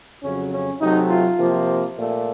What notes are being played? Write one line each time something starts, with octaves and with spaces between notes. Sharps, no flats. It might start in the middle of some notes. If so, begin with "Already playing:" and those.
F2 C#3 F#3 C#4
C#4
C3 F#3 A3 D#4
F4
C3 F3 A#3
A#2 A3